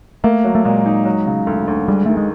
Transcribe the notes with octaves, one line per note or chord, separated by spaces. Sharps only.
A3 A#3
F#3
A3
A#2 G#3
D#4
F#3
C#3
D2
D2
G3 G#3
D#3 A3
G#3